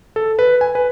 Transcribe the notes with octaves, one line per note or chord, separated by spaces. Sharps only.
A4
B4
G#5
B4